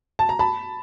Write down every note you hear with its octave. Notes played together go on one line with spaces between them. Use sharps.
A5
A#5
A5 B5